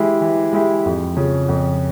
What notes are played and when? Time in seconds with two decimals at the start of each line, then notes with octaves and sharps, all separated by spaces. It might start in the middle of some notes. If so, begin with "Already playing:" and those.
Already playing: E3 G#3 E4 G4
0.21 E3
0.53 G#3 E4 G4
0.85 F2
1.17 C#3 F3
1.49 F2